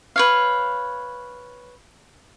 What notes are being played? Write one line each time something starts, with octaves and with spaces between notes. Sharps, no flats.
B4 C#5 F5